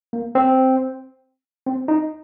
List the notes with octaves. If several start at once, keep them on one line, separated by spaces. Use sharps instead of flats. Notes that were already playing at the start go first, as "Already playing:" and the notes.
A#3
C4
C4
D#4